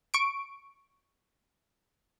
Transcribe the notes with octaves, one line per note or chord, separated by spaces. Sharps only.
C#6 D7